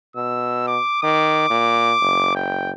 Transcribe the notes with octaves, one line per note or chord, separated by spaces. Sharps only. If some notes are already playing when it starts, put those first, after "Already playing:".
B2 E6
D6
D#3 D6
A#2
F#1
G5